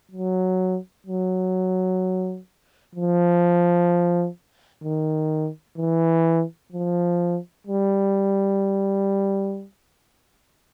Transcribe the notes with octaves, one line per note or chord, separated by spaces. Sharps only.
F#3
F#3
F3
D#3
E3
F3
G3